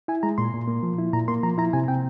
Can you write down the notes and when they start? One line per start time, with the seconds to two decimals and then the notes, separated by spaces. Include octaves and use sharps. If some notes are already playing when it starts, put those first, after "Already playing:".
0.08 E4 G#5
0.23 G#3 A#5
0.38 A#2 C6
0.54 A#2
0.68 A#3
0.83 F3
0.98 E4
1.13 A#2 A#5
1.28 A#3 C6
1.43 F3 A#5
1.58 E4 A#5
1.73 C3 G#5
1.88 C4 G5